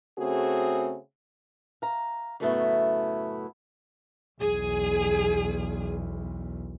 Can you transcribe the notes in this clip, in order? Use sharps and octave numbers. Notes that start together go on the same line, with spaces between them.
C#3 A3 C4 F#4 G#4
F5 A#5
F#2 A2 C#3 A3 B3 E4
B1 E2 G#4